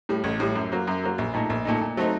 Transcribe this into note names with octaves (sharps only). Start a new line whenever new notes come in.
A2 G3
A1
A2 G3
F#2
F#3 A#3
F#2
F#3 A#3
A#1
A#2 A3 D#4
A#1
A#2 A3 D#4
A#2
F#3 A3 C4 D#4